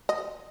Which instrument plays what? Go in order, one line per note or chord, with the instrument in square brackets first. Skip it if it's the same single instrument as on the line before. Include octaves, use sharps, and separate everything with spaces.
[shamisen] D#5